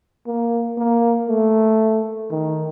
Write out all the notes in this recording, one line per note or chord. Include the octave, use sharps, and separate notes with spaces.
A#3
A#3
A3
D#3